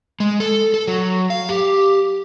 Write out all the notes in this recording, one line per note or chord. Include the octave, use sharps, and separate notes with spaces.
G#3
A4
A4
F#3
F5
G4